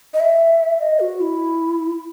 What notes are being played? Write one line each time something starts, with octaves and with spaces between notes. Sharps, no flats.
D#5
E5
D#5
F#4
E4